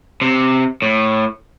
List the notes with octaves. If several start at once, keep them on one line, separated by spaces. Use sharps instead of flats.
C3
A2